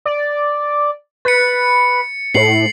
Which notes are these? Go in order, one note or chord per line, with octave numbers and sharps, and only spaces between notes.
D5
B4 A6 C#7
A2 C7 F#7